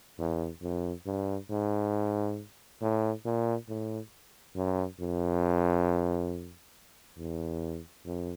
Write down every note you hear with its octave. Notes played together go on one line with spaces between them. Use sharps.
E2
F2
G2
G#2
A2
A#2
A2
F#2
F2
E2
F2